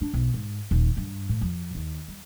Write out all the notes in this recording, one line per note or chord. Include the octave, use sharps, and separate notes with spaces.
D4
B1
G#2
D#1
G2
A2
F2
D#2
G3